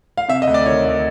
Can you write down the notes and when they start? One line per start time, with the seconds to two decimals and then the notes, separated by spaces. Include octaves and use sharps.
0.17 F5
0.28 C3 E5
0.42 D#5
0.47 D2
0.54 D5
0.66 D#3 C#5
0.85 D2